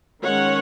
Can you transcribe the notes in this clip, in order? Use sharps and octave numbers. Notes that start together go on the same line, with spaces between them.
D#3 G#3 C#4 C#5 F#5